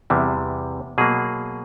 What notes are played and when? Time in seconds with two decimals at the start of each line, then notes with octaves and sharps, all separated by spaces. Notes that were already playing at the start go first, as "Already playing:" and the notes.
0.10 E2 C3 E3 G3
0.98 B2 F#3 A#3 G#4